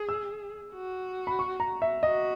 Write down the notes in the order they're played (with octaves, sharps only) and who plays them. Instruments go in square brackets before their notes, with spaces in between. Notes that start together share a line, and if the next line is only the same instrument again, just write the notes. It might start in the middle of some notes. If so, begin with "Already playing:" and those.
Already playing: [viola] G#4
[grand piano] E6
[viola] F#4
[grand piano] B5
C#6
A#5
E5
[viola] F#4 [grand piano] D#5